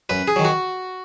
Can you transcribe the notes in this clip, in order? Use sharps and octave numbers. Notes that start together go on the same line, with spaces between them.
F#2 B4
G#4
D#3 F#3
F#4